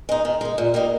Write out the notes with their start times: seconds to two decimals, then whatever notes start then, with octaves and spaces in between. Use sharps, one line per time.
0.09 G#3 D#4
0.25 D#3
0.41 G#3 D#4
0.58 A#2
0.74 G3 A#3 D#4